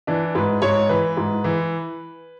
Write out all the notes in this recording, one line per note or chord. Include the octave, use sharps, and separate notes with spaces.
E3 D4
G#2 B4
G#2 C#5
E3 B4
G#2
E3